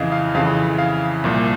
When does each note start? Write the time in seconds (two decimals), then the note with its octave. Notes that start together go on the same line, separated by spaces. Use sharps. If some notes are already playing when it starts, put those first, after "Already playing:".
Already playing: F2 C#3 E3 D#5 F5
0.12 F5
0.34 F2 C#3 E3 F5
0.79 F5
1.24 C2 A#2 F3